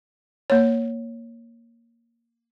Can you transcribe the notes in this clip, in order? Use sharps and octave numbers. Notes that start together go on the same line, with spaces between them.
A#3 C#5